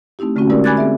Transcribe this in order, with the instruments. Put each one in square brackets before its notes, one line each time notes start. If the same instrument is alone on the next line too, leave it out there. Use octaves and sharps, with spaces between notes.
[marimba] A3 C4 D#4 E4 G4
D3 A3 A#3 C#4 F#4
G#3 D#4 E4 G4 A#4 D5
G#5 B5 D6 F#6 G#6 A6
C4 G#4 E5